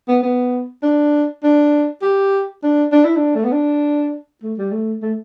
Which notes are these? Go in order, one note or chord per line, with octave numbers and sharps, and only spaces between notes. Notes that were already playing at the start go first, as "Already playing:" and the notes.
B3
B3
D4
D4
G4
D4
D4
E4
D4
A3
B3
D4
A3
G3
A3
A3